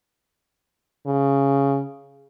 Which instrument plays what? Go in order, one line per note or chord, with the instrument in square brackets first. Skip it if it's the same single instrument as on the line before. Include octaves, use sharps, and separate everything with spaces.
[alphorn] C#3